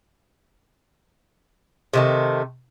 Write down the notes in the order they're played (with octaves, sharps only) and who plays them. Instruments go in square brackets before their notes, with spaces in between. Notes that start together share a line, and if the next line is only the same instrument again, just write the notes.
[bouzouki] C3 D#3 A3